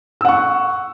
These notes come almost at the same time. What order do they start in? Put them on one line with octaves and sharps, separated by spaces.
E6 F#5 C#6